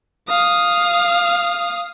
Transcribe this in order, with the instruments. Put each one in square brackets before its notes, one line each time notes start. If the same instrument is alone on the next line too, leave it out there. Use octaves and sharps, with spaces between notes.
[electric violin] F5 D#6